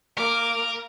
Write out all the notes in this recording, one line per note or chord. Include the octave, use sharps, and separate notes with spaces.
A#3 A#4 D6